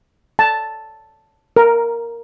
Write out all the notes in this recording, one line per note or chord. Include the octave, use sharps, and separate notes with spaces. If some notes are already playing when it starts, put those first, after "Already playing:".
A5
A#4